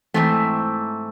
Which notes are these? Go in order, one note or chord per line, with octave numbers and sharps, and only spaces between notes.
G#2 E3 A3 C4